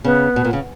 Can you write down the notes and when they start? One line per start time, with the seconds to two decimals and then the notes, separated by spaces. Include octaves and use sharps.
0.04 C#3 B3
0.36 B2
0.45 A#2
0.53 C#3